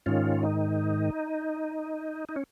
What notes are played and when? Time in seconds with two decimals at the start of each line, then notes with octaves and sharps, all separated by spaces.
0.06 G#2 D#3 C#4 F4
0.43 D#4
2.29 D#4
2.36 C#4